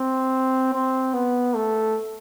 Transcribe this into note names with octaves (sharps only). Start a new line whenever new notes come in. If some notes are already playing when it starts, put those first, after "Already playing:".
Already playing: C4
C4
B3
A3